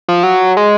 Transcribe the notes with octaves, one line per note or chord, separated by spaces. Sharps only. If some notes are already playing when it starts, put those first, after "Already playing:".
F3
F#3
G#3